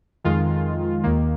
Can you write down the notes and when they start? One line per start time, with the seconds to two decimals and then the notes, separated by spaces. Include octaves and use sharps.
0.24 F2 D#3 G#3 F4
1.04 D#2 D#3 A#3